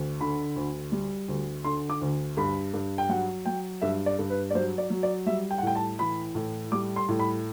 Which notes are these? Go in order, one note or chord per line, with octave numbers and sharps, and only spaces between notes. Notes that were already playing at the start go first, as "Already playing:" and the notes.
Already playing: D2
D3 B5
D2
G3
D2
D3 C6
D6
D2
G2 B5
G2
G5
F#3 F#5
F#3 G5
G2 E5
D5
G2
B4
D5
F#3 C5
D5
F#3
D5
G3 E5
G5
F#5
A2 G5
A5
E3 B5
A2
G3 D6
C6
A2
B5